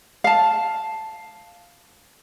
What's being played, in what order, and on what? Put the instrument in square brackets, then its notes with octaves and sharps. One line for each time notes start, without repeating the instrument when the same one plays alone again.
[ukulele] F5 A5